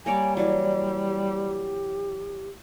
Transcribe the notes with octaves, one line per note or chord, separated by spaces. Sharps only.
G3 A#3 C#5 D5 G#5
E3 F#3 D5
G4